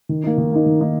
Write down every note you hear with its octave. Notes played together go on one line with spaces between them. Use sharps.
D#3
A#3 D#4
D#3
A#3 D#4
D#3
A#3 D#4